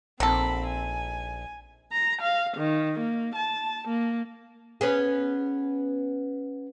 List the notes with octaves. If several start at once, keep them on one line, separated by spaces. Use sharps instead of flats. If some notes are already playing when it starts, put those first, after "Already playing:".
A#1 D#3 C4 A4 B5
G#5
A#5
F5
D#3
A#3
A5
A#3
B3 C#4 G#4